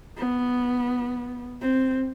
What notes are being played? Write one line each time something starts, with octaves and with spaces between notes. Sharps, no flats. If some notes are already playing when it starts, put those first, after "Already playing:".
B3
C4